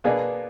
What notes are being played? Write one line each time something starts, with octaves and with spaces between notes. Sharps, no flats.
B2 A#3 D4 G#4 B4